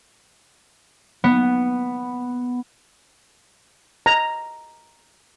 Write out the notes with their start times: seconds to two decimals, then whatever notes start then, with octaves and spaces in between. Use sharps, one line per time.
1.24 B3
4.06 A#5